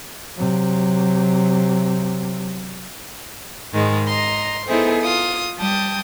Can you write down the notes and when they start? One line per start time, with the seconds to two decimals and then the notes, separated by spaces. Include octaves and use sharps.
0.37 C3 F#3
3.73 G#2 D#3 G#3
4.07 D#5 A#5 C6
4.66 B3 D#4 E4 G#4 A4 C5
5.01 F4 D#6
5.57 G3 G5 A5 D#6